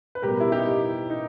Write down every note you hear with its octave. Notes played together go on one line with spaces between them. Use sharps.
B4
B2 G3 B3 G4 A#4
E4
D#4 G4
D#4